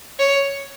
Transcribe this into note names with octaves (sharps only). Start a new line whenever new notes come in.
C#5